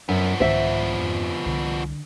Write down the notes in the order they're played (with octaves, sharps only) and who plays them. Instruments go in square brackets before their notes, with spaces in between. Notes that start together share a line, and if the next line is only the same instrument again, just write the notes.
[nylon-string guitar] F#2 [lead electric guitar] F3 B3
[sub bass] C2 [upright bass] G#2 D#3 [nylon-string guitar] C5 E5
[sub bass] F2
[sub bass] C2 [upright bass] D3